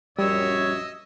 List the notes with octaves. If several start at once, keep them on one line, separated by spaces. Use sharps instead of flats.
A#1 F#2 G3 C#5 D#5 E5 E6